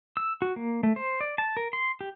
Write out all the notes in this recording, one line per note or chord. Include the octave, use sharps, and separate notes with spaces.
E6
F#4
A#3
A3
C5
D5
A5
A#4
C6
G4